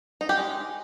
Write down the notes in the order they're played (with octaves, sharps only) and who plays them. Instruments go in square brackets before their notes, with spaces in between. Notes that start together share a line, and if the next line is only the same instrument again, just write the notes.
[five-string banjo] D#4
G4
G#3